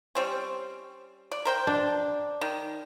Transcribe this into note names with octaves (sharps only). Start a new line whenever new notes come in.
G3 C4 C#4
D5
A#4 C5 G5
D4
D#3